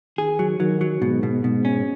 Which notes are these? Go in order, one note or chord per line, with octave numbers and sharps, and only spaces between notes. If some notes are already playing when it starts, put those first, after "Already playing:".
D#3 G#4
F#3
D#3 F#3
F#3
G#2 B2
B2
G#2 B2
C#4